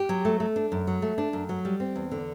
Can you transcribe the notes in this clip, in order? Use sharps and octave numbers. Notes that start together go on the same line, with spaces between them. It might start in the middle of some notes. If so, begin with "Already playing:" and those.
Already playing: G4
F#3
A3
A3
D4
F#2
F#3
A3
D4
F#2
F#3
G3
C4
E2
D3